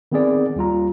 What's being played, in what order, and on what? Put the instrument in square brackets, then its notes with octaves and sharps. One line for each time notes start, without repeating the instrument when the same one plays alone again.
[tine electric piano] D#3 B3 C4 G#4 D5
D#2 G3 F4 A#5